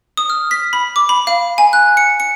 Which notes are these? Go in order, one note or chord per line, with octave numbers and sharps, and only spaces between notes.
D#6
F6
B6
B5
D6
B5
F5
G#5
F#6
C#7
C#7